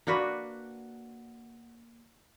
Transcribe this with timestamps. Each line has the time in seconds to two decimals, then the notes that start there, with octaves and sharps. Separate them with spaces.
0.07 A#3 D4 F#4 B4